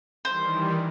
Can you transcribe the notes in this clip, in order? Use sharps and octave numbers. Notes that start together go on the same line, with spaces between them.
D#3 E3 G3 C5